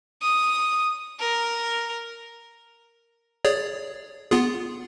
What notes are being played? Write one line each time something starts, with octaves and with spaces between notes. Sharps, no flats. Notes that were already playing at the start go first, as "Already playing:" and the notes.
D#6
A#4
G#4 C#5 D5
B3 F4 G#4